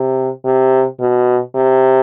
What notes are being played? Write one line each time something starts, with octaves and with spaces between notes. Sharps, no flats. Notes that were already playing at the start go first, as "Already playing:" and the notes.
Already playing: C3
C3
B2
C3